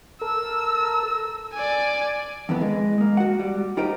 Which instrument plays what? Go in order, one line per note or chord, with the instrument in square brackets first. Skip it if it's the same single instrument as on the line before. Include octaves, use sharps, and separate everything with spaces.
[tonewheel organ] A4 A#4 [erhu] E6
[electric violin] D5 G#5
[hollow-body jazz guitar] F2 E3 B3
G#3
G#3 A#3
F#4 F#5
G3
D#4 F4 G4 A#4 C5 D#5